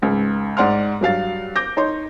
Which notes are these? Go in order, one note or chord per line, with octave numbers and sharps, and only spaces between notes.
C#2 G#2
G#2 D5 F#5 C6 F6
G2 F#3 F5 A6
D6 G6 A#6
D#4 C#5 C6